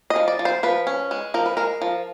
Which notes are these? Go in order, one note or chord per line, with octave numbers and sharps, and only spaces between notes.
D#5
F3
D5
F3
C5
F3 B4
C#4
G#3
F3 A#4
B4
G#3 A#4
F3